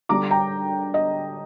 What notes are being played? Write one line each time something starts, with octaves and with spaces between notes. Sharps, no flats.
D3 G3 D4 A#5 D6
G5 A#5
D#5